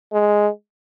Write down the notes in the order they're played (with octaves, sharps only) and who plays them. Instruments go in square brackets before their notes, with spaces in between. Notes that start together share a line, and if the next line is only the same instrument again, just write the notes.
[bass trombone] G#3